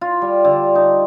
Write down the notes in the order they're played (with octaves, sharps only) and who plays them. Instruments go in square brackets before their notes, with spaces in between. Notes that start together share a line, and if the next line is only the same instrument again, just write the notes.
[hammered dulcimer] F4
G3
D3
D#4